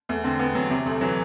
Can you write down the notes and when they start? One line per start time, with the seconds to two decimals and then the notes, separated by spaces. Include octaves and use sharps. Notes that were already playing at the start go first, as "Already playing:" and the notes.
0.09 E2 A3
0.24 D3 C4
0.39 E2 B3
0.55 E2 F#3
0.70 C3 F#3
0.86 D2 A3
1.01 E3 F#3